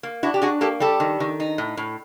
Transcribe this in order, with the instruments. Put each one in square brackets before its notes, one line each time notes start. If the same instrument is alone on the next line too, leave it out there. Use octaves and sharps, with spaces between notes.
[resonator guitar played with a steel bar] A#3
D4 E4 F#4
G4
D4 F#4 G#4
A#3 G4 A4
G3 G4 A4
D#3
D#3
D#4
A2
A2